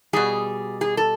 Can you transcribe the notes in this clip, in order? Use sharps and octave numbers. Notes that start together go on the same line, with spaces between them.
B2 G3 G#4
G#4
A4